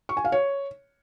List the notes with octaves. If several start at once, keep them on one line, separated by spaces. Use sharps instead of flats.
C#6
G#5
F5
C#5